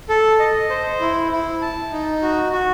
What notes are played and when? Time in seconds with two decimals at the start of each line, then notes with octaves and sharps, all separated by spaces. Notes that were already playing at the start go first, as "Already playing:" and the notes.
0.09 A4
0.39 D#5
0.70 C5
1.00 E4
1.32 E4
1.62 A5
1.92 D#4
2.22 F#4
2.52 F#4